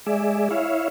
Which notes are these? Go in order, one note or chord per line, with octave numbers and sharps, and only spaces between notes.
G#3 G#4 D5 E5
E4 C#5 E5 F5